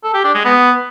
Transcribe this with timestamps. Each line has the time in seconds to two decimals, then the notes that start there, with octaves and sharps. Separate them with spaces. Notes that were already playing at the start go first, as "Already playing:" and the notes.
0.04 A4
0.14 G4
0.24 D4
0.35 G#3
0.45 B3